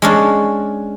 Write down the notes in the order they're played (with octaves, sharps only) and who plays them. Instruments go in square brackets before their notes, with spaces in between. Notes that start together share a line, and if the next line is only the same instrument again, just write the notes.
[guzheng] G#3 C#4 D4